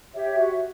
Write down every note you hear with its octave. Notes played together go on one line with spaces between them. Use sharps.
G4 C#5 E5
F#4